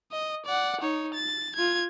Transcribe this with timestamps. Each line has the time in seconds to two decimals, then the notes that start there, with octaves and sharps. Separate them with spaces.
0.12 D#5
0.46 D5 F#5
0.81 D#4 C#5
1.14 A6
1.56 F4 G#6